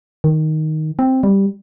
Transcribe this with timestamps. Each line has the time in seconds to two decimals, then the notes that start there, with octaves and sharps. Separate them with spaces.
0.24 D#3
0.99 C4
1.23 G3